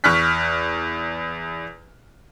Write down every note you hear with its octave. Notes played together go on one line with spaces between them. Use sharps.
E2 C#6 F6 F#6 B6